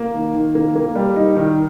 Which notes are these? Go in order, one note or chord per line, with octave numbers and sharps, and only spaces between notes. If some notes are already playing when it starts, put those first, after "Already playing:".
Already playing: A#3
D#3
D#3
A#3
A#3
G3
D#4
D#3